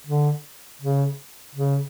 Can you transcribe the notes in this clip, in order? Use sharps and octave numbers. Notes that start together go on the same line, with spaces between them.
D3
C#3
C#3